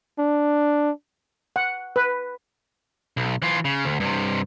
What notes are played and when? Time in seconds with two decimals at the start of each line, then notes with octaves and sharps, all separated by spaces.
0.19 D4
1.56 F#5
1.96 B4
3.17 B1
3.42 E3 F4
3.65 C#3
3.85 D2
4.00 G2 C3